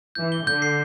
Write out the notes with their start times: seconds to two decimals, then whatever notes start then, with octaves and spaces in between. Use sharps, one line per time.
0.15 E3 G6
0.32 G7
0.47 D3 G6
0.62 C7